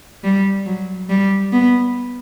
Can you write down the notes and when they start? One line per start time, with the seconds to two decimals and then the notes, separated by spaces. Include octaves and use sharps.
0.24 G3
0.66 F#3
1.10 G3
1.53 B3